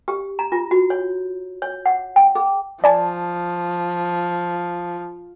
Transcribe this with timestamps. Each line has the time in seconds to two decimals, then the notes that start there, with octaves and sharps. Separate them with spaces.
0.08 G4
0.39 A#5
0.52 F4
0.71 F#4
0.90 C#5
1.62 C#5
1.86 F#5
2.16 G5
2.35 G#4
2.84 F3 D5 G#5 A5